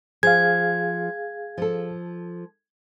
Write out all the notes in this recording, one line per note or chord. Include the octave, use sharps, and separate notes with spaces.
F3 G#4 F5 G#6
F3 A4